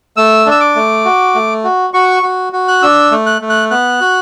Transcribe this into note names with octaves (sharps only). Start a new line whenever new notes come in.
A3 E6
D4
E6
D6
A3
F#4
A3
F#4
F#4 C#6
F#4
F#4
F#6
D4 E6
A3
F#6
A3
F#6
B3 F#6
F#4